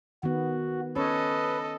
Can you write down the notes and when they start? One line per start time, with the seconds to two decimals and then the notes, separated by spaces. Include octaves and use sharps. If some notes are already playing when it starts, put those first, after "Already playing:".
0.23 D#3 B3 F#4
0.96 C#4 A4 B4 C#5 D#5